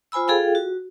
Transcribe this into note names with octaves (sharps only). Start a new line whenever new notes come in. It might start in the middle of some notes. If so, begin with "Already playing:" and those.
F4 C5 G#5 B5 E6
F4 G#4 A4 F5 G5
F#4